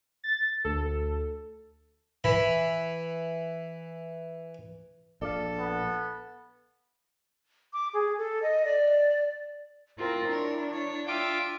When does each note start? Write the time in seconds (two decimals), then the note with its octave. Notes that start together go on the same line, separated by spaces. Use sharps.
0.24 A6
0.64 D2 A4
2.24 E3 B5
5.22 A#1 A4 D5 F5
5.59 B3
7.73 D6
7.94 G#4
8.18 A4
8.42 D#5
8.65 D5
9.98 C4 E4 F4 A#4
10.30 D4 A#4 C#5
10.71 C#5
11.07 F4 E5 G5 D6